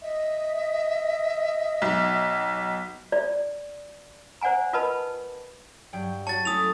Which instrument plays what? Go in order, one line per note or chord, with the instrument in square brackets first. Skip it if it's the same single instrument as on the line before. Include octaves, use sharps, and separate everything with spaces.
[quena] D#5 [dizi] E5
[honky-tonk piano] B1
[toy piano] D5
C5 D5 F#5 G#5 A#5
F4 A#4 B4 D#5 A5 B5
[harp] G2 F#3 G5
[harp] F#4 C#5 [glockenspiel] A5 A6
[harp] A3 C#4 E4 [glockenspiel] D#6 F7